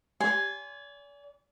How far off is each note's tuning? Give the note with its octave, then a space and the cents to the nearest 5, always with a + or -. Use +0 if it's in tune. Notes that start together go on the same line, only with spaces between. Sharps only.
D5 -40 G#5 +0 C6 -5